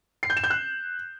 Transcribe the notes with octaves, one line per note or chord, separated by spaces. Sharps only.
C7
G6
E7
G6
F#6